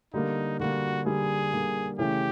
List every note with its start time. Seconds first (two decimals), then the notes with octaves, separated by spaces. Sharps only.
0.13 D3 G3 A#3 D#4
0.60 D3 G3 A#3 F#4
1.06 D3 G3 A#3 G#4
1.53 D3 G3 A#3
1.98 C#3 E3 A3 C#4 E4 G4